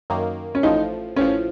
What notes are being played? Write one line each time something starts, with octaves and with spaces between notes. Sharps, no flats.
F#2 D#3 A#3
C#4
A1 A2 F3 D#4
A1 A2 F3 C#4